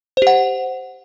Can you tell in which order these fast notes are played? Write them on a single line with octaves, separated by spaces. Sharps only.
C5 G4 F#5